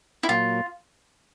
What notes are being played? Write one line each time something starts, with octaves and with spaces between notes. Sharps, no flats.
E4
A#2 F#3 A#3 F4